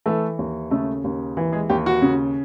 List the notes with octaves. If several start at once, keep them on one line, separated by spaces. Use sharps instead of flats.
E3 A3 A4
D#2
C#3 A3 A4
D#2
E3
G#3 G#4
D#2 G4
F#4
C#3